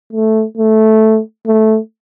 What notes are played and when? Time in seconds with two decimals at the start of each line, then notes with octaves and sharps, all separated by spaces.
0.13 A3
0.58 A3
1.47 A3